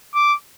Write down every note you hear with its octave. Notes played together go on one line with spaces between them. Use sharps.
D6